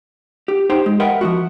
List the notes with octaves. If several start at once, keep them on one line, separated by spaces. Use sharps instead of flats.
G4
D#4 G4 C5 G5
G#3
A#4 B4 D#5 E5 F#5 G5
F3 G#3 F#4